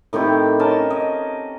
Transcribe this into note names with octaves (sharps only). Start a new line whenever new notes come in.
A2 D#3 C4 G4
C#4 A#4 D#5 A5
D#5